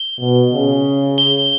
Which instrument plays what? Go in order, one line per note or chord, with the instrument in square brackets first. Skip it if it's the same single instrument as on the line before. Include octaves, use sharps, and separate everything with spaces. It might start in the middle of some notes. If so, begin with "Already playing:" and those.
Already playing: [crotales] G7
[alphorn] B2
C#3
[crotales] G7